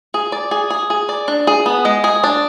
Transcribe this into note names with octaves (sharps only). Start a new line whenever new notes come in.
G#4
D5
G#4
G#4
G#4
D5
D4
G#4
B3
G#3
G#4
D4